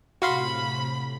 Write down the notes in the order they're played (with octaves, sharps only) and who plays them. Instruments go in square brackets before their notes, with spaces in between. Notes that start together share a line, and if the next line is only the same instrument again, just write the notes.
[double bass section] A2 C3 [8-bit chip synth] F#4 F5 C6 [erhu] B5